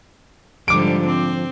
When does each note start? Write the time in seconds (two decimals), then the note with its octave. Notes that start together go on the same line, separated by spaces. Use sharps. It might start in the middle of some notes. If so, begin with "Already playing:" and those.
0.68 G#2 D3 F3 G3 D6 D7
1.07 C4